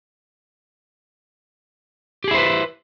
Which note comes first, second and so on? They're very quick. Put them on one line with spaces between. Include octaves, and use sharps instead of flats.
G4 G#4 E4 C5 B4